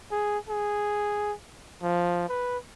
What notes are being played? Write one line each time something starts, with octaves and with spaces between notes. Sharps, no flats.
G#4
G#4
F3
B4